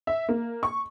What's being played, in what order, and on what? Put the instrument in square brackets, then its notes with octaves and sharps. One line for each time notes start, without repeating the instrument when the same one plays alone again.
[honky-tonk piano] E5
A#3
C#6